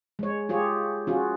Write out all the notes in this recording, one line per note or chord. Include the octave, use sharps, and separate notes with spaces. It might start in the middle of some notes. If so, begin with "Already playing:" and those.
G#3 C#5
F4 G4 G#4 C#5
C#4 F4 F#4 G#4